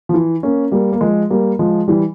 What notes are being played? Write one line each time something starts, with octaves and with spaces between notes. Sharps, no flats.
F3
E3
A#3 C#4
G3 A#3
A#3
F3 G#3
G3 A#3
F3 G#3
E3 G3